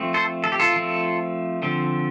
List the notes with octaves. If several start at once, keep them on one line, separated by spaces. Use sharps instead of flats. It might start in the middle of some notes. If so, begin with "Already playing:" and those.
Already playing: F3 A3 C4
A4 C5
A4
G4
F4 A4
F3 A3 C4
D3 F3 C4